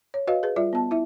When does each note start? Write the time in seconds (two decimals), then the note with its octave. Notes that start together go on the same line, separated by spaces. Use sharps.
0.14 C#5
0.27 F#4 B4 D#5 F5
0.43 G#4 B4
0.56 G3 F4 D5 E5
0.73 B3 A5
0.91 E4 E5